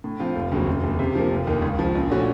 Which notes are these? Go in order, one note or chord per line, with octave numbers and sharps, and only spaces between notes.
A2
F3 C4 F4
F1
D#2 C#3 F#3 C4
F1
D#2 C#3
C3
F3 A#3
F1
D#2 D#3 A#3
C#2
C#3 F3
A#1
A#2 A3 C#4 F#4